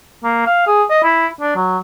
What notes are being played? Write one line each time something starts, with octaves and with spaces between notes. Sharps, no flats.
A#3
F5
G#4
D#5
E4
D4
F#3